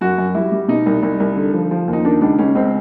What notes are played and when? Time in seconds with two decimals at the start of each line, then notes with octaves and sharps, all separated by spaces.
0.01 F#2 F#4
0.18 F#2
0.35 G3 E4
0.52 G3
0.68 B2 D#4
0.86 C2
1.03 C2
1.20 C2
1.36 D3
1.54 F3
1.71 F3
1.88 D#2
1.93 D#4
2.05 D#3 D4
2.21 C#2 D4
2.39 C#2 C#4
2.55 C#2 C4